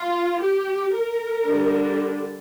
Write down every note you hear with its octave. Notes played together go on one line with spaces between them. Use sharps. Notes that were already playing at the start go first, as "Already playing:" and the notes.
Already playing: F4
G4
A#4
D3 G3 D4